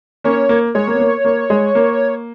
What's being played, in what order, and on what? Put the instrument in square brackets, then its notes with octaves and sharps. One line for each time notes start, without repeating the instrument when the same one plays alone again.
[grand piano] A#3 C#4 [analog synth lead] C#5
[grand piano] A#3
[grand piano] G#3 [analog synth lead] C#5
[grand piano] A#3
B3
A#3
A#3
G#3
A#3